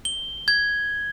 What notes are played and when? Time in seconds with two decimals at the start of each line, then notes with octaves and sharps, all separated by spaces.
0.05 G7
0.48 G#6